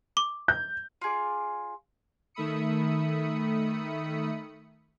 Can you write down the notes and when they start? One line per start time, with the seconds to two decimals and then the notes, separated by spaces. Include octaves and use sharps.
0.17 D6
0.48 G6
1.01 F4 G#4 D5
2.34 D#3 A3 E5 B5 D#6 C#7